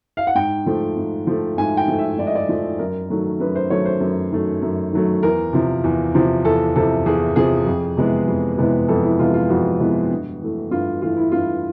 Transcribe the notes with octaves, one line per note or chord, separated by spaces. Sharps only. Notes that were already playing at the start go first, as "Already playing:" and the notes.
F5
F#5
G#2 G5
F3 A3
G#2
F3 A3
G#2 G#5
G5
F3 A3
E5
G#2 D5
D#5
D5
F3 A3
F#2 A#4
D#3 F#3 A3
F#2 B4
C5
D#3 F#3 A3 C#5
C5
F#2
D#3 F#3 A3
F#2
D#3 F#3 A3
E2 A#4
C3 F3
E2
C3 F3
E2 A4
C3 F3 A4
E2 G#4
C3 F3 G#4
F2
C3 E3 G#3 B3
F2
C3 E3 G#3 B3
F2 A4
E4
C3 E3 G#3 B3 F4
F4
F2 F#4
C3 E3 G#3 B3
G2
E3 A3
G2 F4
E3 A3 F4
E4
G2 F4